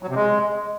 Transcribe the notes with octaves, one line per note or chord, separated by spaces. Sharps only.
F#3
C3
G#3